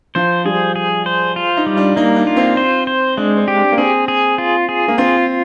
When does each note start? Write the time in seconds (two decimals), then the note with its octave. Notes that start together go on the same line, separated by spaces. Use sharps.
0.15 F3 C5
0.45 G3 G#4
0.75 G#4
1.06 C5
1.36 F4
1.57 D#4
1.66 G3
1.77 D4
1.96 A#3 D#4
2.16 D4
2.27 F4
2.37 C4
2.57 C5
2.87 C5
3.17 G#3 D4
3.37 C4
3.48 G4
3.57 D4
3.72 A#3
3.78 C4 G#4
4.08 G#4
4.38 F4
4.69 G#4
4.88 A#3
4.98 C4 F4